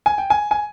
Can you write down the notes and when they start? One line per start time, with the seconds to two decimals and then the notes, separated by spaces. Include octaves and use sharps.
0.06 G#5
0.18 G5
0.30 G#5
0.51 G#5